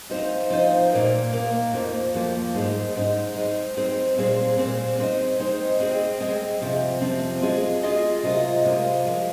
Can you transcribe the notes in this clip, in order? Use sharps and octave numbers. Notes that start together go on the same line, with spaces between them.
F3 C4 D#4 C5 D#5
F3 C4 D#4 C5 D#5
A#2 A#3 D#4 A#4
A#2 A#3 D#4 A#4
F2 F3 A#3
F2 F3 A#3
G#2 G#3 D#4
G#2 G#3 D#4
G#3 C4 D#4
G#3 C4 D#4
A#2 G#3 C4 G#4
A#2 G#3 C4 G#4
G#3 C4 D#4 C5 D#5
G#3 C4 D#4 C5 D#5
G#3 C4 G#4 D#5
G#3 C4 G#4 D#5
F2 C3 F3 C4
F2 C3 F3 C4
G#3 F4 G#4 D#5
G#3 F4 G#4 D#5
C3 G#3 F4 A#4 D#5
C3 G#3 F4 A#4 D#5
F3 G#3